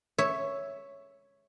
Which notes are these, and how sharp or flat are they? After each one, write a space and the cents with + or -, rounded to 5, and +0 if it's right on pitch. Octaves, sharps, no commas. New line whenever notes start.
C#5 +0 E5 +0